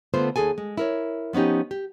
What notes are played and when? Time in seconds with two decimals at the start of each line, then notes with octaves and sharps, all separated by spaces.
0.14 D3 A3 B3 F4 A4 C5
0.36 D#2 G#4 A4 G#5
0.58 G#3
0.78 E4 A#4 C#5
1.33 F3 B3 C#4 D#4 G4
1.71 G4